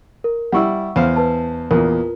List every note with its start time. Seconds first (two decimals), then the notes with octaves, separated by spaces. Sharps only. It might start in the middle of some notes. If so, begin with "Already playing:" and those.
0.24 A#4
0.52 G3 E4 F#5 C#6 E6
0.96 E2 C5 F5
1.16 B4 A5
1.71 E2 A#2 F4 A#4